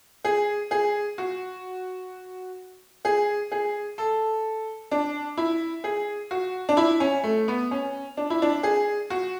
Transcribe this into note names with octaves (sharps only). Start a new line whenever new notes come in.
G#4
G#4
F#4
G#4
G#4
A4
D4
E4
G#4
F#4
D4
E4
C#4
A3
B3
C#4
D4
E4
D4
G#4
F#4